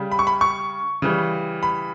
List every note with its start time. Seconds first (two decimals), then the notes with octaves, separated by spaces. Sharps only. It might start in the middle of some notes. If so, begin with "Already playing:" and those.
Already playing: C#3 G3
0.12 B5
0.19 C#6
0.27 B5
0.41 C#6
1.02 C#3 E3 G3
1.63 B5